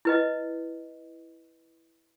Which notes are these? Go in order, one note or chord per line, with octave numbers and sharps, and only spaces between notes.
E4 B4 D#5